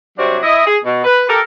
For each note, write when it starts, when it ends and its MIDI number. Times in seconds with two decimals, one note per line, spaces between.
0.18 0.37 48
0.18 0.37 54
0.18 0.37 55
0.18 0.37 60
0.18 0.37 62
0.18 0.37 66
0.43 0.66 64
0.43 0.66 75
0.66 0.78 68
0.84 1.03 47
1.04 1.27 71
1.28 1.40 67
1.28 1.40 69
1.28 1.40 70